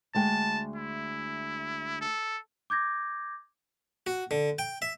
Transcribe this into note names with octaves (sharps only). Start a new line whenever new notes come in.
D2 G#3 G5 A5
E4
A4
D6 G6 G#6 A#6
F#4
D3
G5
E5